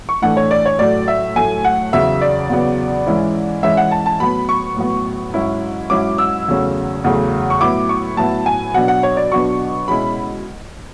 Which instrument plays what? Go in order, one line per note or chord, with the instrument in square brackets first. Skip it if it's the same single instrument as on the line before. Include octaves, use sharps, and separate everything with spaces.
[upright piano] C#6
A2 E3 A3 D4 F#5
C#5
D5
C#5
A2 F#3 A3 D5
E5
A2 F#3 A3 G#5
F#5
E2 C#3 F#3 B3 E5
D5
E2 C#3 F#3 B3
G#2 E3 G#3 C#4 E4
G#2 E3 G#3 C#4 E4 E5
F#5
A5
A5
A2 F#3 B3 B5
C#6
A2 F#3 B3
G#2 F#3 C#4 E4
G#2 F#3 C#4 E4 D6
E6
E2 C#3 F#3 A3 C#4
E2 C#3 F#3 A3 C#4
C#6
A2 F#3 B3 E4 D6
C#6
A2 F#3 B3 E4 A5
G#5
B2 F#3 B3 D4 F#5
F#5
C#5
D5
B2 F#3 B3 D4 C#6
B2 G#3 C#4 E4 B5